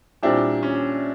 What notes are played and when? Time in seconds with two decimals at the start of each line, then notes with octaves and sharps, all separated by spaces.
0.23 A#2 G3 C4 D4 E4 G4
0.63 C#4